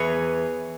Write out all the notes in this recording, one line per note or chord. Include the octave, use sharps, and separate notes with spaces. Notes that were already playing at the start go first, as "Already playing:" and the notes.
Already playing: E2 E3 G#4 B4 C#5